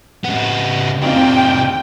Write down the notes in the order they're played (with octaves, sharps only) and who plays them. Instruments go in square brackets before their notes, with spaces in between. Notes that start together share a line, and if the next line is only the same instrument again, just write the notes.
[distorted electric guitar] C#3 B3
[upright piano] F1 C4 F4 [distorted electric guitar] C3 D#3 [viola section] G5